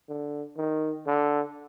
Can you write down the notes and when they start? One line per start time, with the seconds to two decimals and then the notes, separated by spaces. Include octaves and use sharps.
0.08 D3
0.57 D#3
1.07 D3